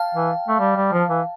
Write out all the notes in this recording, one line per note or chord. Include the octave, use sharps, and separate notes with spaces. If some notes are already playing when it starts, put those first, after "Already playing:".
Already playing: F5 G5 A5
E3
A3
G3
G3
F3
E3